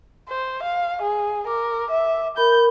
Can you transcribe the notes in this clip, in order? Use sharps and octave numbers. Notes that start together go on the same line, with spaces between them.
C5
F5
G#4
A#4 D6
E5
A#4 B5 G6